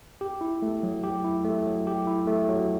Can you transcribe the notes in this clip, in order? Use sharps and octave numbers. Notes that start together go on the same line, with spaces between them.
G4
E4
A3
F#3
G4
E4
A3
F#3
G4
E4
A3
F#3